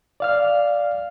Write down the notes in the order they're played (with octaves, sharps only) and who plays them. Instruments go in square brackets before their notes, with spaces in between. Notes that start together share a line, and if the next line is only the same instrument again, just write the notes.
[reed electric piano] D5 F5 F6